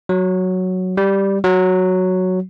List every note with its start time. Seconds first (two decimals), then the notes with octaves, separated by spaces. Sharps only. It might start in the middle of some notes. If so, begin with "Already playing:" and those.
0.09 F#3
0.97 G3
1.44 F#3